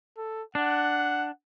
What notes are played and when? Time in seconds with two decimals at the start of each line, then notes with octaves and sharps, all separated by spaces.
0.17 A4
0.55 D4 F#5